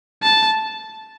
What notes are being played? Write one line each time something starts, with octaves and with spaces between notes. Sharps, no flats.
A5